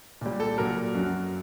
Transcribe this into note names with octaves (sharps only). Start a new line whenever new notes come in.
A#2 G3
A4
A#2 F#3 A#4
F#2 F#3